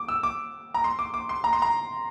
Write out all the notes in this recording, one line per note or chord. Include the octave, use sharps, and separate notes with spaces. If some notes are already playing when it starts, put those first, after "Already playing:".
Already playing: D6
E6
D6
A#5
C6
D6
D6
C6
A#5
C6
A#5